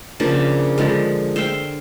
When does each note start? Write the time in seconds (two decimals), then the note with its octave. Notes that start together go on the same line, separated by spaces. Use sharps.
0.20 C#3 F3 A#3 D4
0.78 D3 F3 G#3
1.36 C5 E5 F5 G5